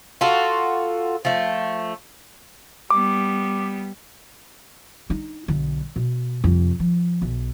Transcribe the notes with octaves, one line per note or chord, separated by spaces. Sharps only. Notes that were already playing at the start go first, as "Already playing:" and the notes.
F4 F#4 A4
F3 A3
G3 B3 D6
D4 D#4
B1 D3
B2
F2 C3
F3
B1